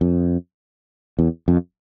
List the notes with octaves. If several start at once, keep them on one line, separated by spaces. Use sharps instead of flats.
F2
E2
F2